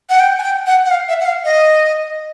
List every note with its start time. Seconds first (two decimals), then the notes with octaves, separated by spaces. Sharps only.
0.10 F#5
0.20 G5
0.39 G#5
0.43 G5
0.67 F#5
0.85 F#5
0.91 F5
1.09 E5
1.20 F#5
1.26 F5
1.44 D#5